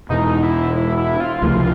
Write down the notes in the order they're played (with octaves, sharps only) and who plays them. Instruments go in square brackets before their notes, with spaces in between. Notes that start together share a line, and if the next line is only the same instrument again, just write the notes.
[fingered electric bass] E2 B2 G#3 [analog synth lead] D#4
[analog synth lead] E4
E4
E4
F4
[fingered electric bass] C#2 C3 F3 A3